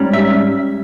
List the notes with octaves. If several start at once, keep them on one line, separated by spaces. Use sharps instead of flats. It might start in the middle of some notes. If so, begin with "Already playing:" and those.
Already playing: G#2 G3 C#4
E5